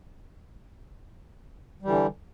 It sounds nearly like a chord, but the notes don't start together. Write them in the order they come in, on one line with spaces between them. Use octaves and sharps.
G3 E3 D3